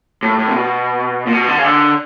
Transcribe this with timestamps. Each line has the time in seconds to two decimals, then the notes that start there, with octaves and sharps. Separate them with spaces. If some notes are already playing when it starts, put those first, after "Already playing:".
0.23 A2
0.39 A2
0.48 C3
0.54 B2
1.27 A#2
1.33 B2
1.48 D3
1.58 C#3
1.64 D3